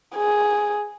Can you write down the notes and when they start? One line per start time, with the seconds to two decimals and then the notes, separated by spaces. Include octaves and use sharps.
0.16 G#4